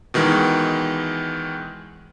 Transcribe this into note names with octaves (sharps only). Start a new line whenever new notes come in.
B2 D#3 E3 G#3